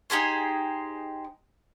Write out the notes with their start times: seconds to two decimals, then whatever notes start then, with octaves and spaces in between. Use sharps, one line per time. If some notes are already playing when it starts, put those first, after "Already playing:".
0.10 D#4 G4 G#4 C5